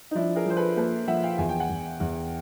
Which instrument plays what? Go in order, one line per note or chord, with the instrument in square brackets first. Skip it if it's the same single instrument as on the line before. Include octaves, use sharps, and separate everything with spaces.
[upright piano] D#4
[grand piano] F3 [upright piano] D4 E4
[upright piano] G#4 A#4
[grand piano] F3 [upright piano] C5
[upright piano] A4 B4
[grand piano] A#3 [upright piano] A4 B4
[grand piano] F3 [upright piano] E5 F#5
[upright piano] F5 G5
[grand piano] E2 [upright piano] G#5
[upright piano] G5
F#5 G#5
[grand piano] E2
E2